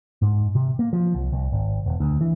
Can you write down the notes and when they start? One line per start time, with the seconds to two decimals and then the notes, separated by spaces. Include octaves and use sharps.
0.22 G#2
0.55 C3
0.79 A#3
0.93 F3
1.15 C2
1.32 C2
1.52 G#1
1.86 E1
2.00 D2
2.21 E3